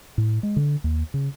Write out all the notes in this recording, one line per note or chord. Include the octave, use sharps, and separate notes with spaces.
A2
G#3
D3
D#2
C#3